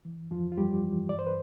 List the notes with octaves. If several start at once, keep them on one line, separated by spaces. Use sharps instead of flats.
E3
F2 F3 F4
F4
F2 G3 G4
E3
G2 D5
C5
B4